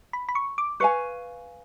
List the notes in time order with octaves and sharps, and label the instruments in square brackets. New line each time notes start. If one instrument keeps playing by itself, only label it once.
[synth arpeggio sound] B5
B5
C#6
D6
[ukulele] B4 F5 G#5 [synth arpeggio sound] C#6